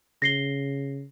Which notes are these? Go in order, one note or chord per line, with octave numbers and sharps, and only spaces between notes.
C#3 A#6 C7 G7